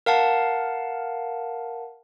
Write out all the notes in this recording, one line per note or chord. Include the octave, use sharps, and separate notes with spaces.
A#4 F5 F#5 A5